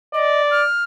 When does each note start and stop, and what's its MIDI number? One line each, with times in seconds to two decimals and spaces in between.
0.14 0.63 74
0.14 0.42 75
0.51 0.84 89